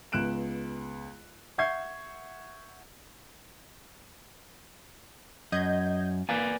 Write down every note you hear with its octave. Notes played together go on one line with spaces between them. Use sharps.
C#2 B3 F#6 D7 E7
E5 F#5 C#6 G6 G#6 C7
F#2 D#5 G6 G#6
A#3 B4 D5 G#5